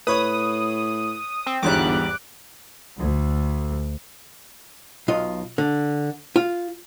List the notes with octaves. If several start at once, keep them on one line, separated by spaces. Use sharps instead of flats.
A2 B4 C#5 D#6
C4
G1 E2 G#2 G3 D6 F#6
D2
B1 F4 D#5
D3
F4